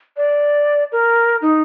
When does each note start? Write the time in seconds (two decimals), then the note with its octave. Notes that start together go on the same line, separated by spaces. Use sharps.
0.17 D5
0.92 A#4
1.42 D#4